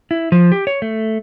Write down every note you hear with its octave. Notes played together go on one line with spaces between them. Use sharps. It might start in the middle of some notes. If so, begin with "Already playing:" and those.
E4
F3
G4
C#5
A3